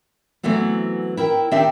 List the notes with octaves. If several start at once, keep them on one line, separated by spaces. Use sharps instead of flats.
E3 F#3 A3 B3 C4
E4 A#4 G5
D#3 C4 D4 G4 E5